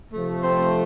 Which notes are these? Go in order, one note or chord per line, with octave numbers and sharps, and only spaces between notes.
C3 F3 A3
C4 C5